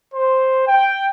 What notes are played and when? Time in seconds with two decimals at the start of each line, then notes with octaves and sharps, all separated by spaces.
0.13 C5
0.67 G5